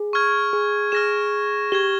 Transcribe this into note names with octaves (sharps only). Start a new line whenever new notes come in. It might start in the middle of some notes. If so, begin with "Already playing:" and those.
Already playing: G#4
C#6 F6 G#6
G#4
G#4 F6 A#6 E7
G4 G#6 E7 G7